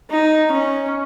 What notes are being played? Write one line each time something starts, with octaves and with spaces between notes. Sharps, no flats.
D#4
C#4